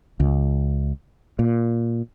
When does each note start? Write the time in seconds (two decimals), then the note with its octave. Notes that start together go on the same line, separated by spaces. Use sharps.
0.20 C#2
1.39 A#2